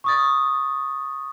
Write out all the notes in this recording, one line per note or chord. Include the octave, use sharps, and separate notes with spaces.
C#6 D#6 A6